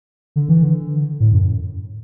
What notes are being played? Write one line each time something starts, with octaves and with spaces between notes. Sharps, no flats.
D3
E3
D3
A2
F#2